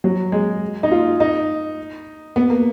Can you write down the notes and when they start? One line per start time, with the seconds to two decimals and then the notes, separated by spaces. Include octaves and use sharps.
0.04 F#3
0.32 G#3
0.83 D#4
0.92 F4
1.20 D#4
2.36 B3
2.50 A#3